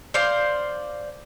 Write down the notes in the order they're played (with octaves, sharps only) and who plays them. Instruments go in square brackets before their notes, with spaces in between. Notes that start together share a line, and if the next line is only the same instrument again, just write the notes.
[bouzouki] C5 D5 F5